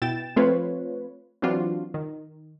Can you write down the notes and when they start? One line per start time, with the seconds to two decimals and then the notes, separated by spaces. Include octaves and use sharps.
0.02 B2 E4 G5 A6 E7
0.36 F3 A3 C4 F4 B4 C#5
1.42 E3 F#3 C4 D4 F4 F#4
1.94 D#3